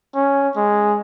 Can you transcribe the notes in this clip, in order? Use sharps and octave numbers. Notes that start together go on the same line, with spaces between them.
C#4
G#3